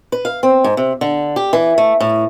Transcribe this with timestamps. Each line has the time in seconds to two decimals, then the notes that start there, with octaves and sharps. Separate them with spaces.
0.12 B4
0.25 F5
0.43 C4
0.64 G#2
0.77 C3
1.01 D3
1.36 G4
1.53 E3
1.78 A3
2.01 A2